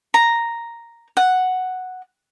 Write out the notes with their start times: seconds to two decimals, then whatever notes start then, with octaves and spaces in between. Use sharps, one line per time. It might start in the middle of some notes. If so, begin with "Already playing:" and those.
0.14 A#5
1.17 F#5